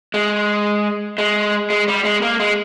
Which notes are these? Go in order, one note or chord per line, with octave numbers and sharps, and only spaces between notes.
G#3
G#3
G#3
G3
G#3
A#3
G#3